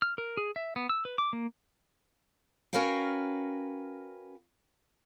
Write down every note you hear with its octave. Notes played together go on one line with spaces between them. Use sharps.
F6
A#4
G#4
E5
B3
E6
B4
D6
A#3
C#4 F#4 A#4 B4 F5 G5